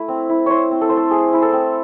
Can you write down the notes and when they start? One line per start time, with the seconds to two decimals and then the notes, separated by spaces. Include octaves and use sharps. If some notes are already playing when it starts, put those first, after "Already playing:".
Already playing: A3 E4
0.08 C4
0.29 E4
0.46 E4 C5 C#5
0.71 C4
0.81 A4
0.89 A3 C5
0.97 A4
1.11 A3 G#4
1.33 E4
1.42 A4
1.52 C4